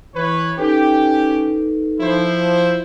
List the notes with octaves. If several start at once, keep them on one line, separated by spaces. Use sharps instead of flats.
E3 B4 C#5
C#4 D#4 G4 A4 B4
F3 E4 C5